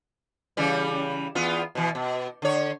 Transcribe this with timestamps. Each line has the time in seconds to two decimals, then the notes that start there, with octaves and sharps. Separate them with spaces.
0.57 C#3 E3 G3
1.35 E2 B3 F4
1.75 B2 E3
1.95 B2
2.42 D3 C#5